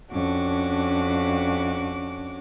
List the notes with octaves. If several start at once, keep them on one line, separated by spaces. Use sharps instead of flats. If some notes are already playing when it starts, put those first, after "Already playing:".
F2 C#4 D4 F#4 D6